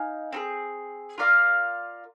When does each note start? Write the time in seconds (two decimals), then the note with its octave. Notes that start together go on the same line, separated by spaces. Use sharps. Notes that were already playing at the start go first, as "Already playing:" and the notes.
Already playing: D#4 F5 G#5
0.33 C4 D#4 G#4
1.18 F4 A#4 D5 F5